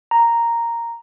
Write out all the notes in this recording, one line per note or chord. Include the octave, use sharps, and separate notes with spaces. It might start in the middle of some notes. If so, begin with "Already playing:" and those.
A#5